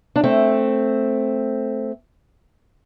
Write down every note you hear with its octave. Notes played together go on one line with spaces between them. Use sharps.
D4
A3 C4